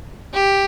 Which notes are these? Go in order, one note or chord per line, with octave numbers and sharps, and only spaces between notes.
G4